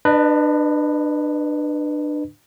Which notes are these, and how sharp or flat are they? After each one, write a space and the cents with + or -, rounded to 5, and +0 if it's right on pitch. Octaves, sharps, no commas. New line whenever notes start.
D4 +25 B4 +0 D#5 -25